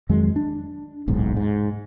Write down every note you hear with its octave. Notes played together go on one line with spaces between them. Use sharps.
F2 D#3 F#3 G#3
D4
D1 B1 G#2
G#2